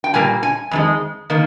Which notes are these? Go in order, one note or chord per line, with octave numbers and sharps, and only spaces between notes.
G5
A#2 G3 A#3 G#5
G#5
F2 D#3 G#3
D#3 A#3